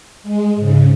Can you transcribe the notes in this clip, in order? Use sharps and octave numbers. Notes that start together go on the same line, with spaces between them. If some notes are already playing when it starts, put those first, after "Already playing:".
G#3
G#2 C#3